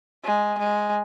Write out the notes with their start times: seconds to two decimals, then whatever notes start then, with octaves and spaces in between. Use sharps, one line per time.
0.24 G#3
0.58 G#3